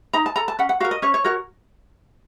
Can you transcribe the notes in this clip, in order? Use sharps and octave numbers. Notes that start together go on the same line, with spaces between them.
D#4 A#5
A5
A4 A#5
A5
C#4 F#5
F#5
F#4 A#4 F5
D#5
C#4 C#5
C#5
F#4 A#4 C#5